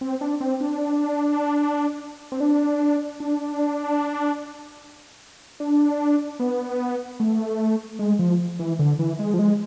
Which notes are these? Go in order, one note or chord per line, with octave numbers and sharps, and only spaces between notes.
C4
D4
C4
D4
C4
D4
D4
D4
B3
A3
G#3
F3
E3
D3
E3
G#3
F3
G#3